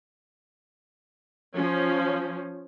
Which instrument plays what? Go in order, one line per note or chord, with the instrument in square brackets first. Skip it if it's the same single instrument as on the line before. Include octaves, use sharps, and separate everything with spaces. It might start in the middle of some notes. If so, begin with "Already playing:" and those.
[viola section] F3 C#4